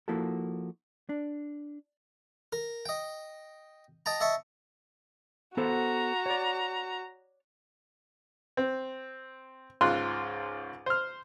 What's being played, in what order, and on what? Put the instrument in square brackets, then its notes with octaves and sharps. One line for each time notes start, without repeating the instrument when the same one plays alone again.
[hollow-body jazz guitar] F3 A#3 E4 F#4 A4
D4
[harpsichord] A#4
D#5 G5
D#5 G5 A5 A#5
D#5 E5 A5 C#6
[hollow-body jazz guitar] B3 A4 C5 [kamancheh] F#4 A#5
[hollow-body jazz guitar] C#5 D5
[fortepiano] C4
C#2 G#2 F4 C6 F#6
C5 F6